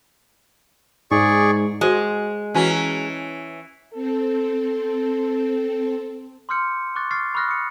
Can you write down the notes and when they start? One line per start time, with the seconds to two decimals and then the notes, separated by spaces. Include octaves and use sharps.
1.11 G#2 G#4 D5 C#6
1.81 G#3 F#4 C5
2.54 E3 C#4 F#4 G#5 A#5
3.94 C4 A4
6.49 C6 D6 E6 F6 G6 C#7
6.96 C#6 D6 F#6 A6
7.11 C#6 D6 F6 A6 C7
7.35 B5 C#6 D#6 F6 F#6 A#6
7.48 D#6 C#7